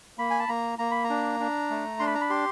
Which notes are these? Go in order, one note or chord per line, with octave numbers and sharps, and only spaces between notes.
A#3 B5
G#5
A5
A#3 A#5
A#3 A#5
B5
A#5
D4
D4
A3
D4 C6
B5
A#5
B5
G4 C6